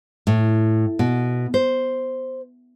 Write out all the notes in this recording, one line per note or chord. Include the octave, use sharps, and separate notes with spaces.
A2
B2
C5